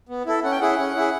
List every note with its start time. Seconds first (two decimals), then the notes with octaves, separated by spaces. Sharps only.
0.09 B3
0.26 E4 A4
0.43 C#4 F#5
0.52 G5
0.60 E4 G#4 F#5
0.78 C#4
0.95 E4 G#4